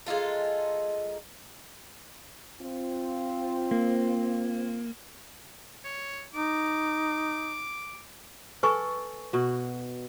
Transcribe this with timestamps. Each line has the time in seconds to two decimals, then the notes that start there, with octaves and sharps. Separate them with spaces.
0.07 G#3 D#4 F4 A4
2.60 C4 F4
3.71 A#3
5.84 C#5
6.34 D#4 D6
8.63 A4 B4 G#5 C#6
9.33 B2 F#4